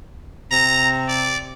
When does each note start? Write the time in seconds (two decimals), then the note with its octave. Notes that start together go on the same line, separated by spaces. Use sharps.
0.51 C3 A#5
1.08 D5